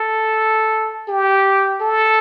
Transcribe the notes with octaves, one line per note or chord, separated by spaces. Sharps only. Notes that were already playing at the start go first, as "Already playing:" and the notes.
Already playing: A4
G4
A4